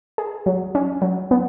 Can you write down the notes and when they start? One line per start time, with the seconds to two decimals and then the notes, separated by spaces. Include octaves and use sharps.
0.18 G#4
0.46 F#3
0.75 C#4
1.02 F#3
1.31 B3